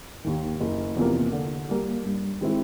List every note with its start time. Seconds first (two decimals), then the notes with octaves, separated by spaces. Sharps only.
0.24 D#2 D#3
0.60 F#1
0.96 E2 C3 F3 A#3
1.32 D3
1.69 G3 A#3
2.04 G2
2.41 D#3 G#3 C4 E4